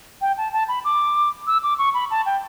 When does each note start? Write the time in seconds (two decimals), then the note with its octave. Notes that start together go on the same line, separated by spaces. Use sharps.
0.21 G5
0.38 A5
0.53 A5
0.68 B5
0.85 D6
1.47 E6
1.63 D6
1.79 C#6
1.94 B5
2.11 A5
2.26 G5